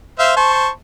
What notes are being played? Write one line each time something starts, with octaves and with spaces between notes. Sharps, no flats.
C5 E5 F5
C5 A5 C#6